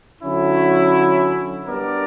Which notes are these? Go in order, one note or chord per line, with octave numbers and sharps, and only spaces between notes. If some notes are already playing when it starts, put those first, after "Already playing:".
D3 F#3 C#4 E4
G3 B3 D4 A#4 D5